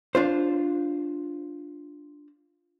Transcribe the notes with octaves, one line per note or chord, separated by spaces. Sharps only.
D4 F4 C5